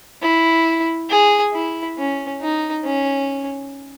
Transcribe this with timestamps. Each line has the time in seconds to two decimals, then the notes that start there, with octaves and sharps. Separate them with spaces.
0.22 E4
1.10 G#4
1.53 E4
1.98 C#4
2.41 D#4
2.85 C#4